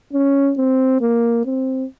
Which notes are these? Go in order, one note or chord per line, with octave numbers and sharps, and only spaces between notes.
C#4
C4
A#3
C4